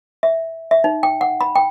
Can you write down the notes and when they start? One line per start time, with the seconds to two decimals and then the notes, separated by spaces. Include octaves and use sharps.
0.23 E5
0.71 E5
0.84 D#4
1.03 G5
1.21 F#5
1.41 B5
1.56 G5